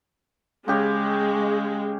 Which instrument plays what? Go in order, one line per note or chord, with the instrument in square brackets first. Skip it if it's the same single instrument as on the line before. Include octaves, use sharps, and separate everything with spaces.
[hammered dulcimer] C#3 G4 C#5 [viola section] G#3